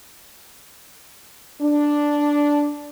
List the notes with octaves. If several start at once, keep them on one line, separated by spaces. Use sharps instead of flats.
D4